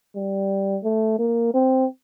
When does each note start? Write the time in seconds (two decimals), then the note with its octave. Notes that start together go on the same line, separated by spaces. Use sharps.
0.15 G3
0.84 A3
1.19 A#3
1.54 C4